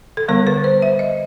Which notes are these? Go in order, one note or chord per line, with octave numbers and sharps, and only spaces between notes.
A4
D3 G3 B3 A#4
B4
C5
E5
D#5